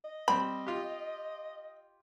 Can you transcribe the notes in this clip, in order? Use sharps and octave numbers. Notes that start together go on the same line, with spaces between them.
D#5
G3 C4 B5
F4 G4